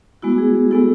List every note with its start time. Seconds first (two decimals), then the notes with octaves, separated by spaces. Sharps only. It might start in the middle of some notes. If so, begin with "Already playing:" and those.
0.22 G#3 B3 E4 F#4
0.38 G#4
0.55 G#4
0.71 G#3 B3 E4 A4